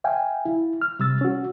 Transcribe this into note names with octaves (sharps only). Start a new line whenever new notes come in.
E5 F5 G5 G#5
E4
F6
C3 G3 E6 A6
C#4 F#4